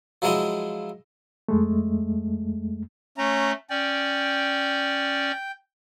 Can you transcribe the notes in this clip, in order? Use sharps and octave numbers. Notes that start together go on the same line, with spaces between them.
F3 F#3 G#3 E4 F4 D#5
F2 G#3 A3
A3 C#4 A#5
C#4 D5 G5